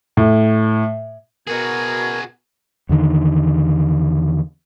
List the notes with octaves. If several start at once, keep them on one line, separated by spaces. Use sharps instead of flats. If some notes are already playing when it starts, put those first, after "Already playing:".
A2
B2 F#4 G#4 A#4 G#6
E2 D3 D#3